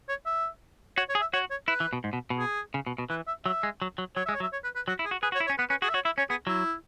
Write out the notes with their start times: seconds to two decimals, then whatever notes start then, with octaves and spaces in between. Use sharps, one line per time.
0.09 C#5
0.26 E5
0.97 F#4 C#5
1.09 C#5
1.15 G#4
1.21 E5
1.33 F#4 C#5
1.50 C#5
1.68 E4 B4
1.80 E3
1.93 B2
2.04 G#2
2.13 B2
2.30 B2
2.39 G#4
2.74 C#3
2.87 B2
2.98 B2
3.10 E3 B4
3.27 E5
3.45 F#3 E5
3.63 G#3
3.82 F#3
3.98 F#3
4.16 F#3 C#5
4.26 E5
4.29 G#3
4.34 C#5
4.40 F#3 E5
4.53 C#5
4.64 B4
4.76 B4
4.88 F#3 F#4
4.99 E4
5.05 G#4
5.11 F#4
5.23 G#4 B4
5.32 F#4
5.35 C#5
5.40 E4
5.47 C#5
5.50 C#4
5.58 B3 B4
5.70 C#4 B4
5.82 F#4 G#4
5.89 E5
5.94 F#4 C#5
6.05 E4 E5
6.18 C#4 C#5
6.30 B3 G#4
6.47 F#3 E4